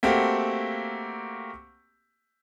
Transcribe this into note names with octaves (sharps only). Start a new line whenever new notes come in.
A3 A#3 C4 F#4 G4